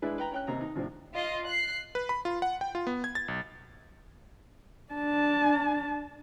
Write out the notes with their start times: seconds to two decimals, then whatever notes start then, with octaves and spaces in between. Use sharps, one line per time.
0.02 G#3 D4 E4 B4
0.18 B4 G5 A#5
0.32 C#4 G5 F#6
0.47 D#2 C3 A#5
0.61 D#4
0.75 A2 C3 F3 C4 D4
1.14 F4 D#5
1.47 F#6 C7
1.95 B4
2.09 B5
2.25 F4
2.42 F#5
2.61 G5
2.75 F4
2.87 B3
3.04 G#6
3.15 A6
3.28 B1
4.93 D4 A5